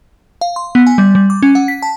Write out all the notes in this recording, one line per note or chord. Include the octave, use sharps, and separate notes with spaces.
F5
C6
B3
G#5
G3
G3
D6
C#4
F#5
B6
A5